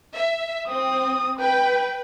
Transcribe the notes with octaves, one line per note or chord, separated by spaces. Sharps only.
E5
C4 D#6
B4 G5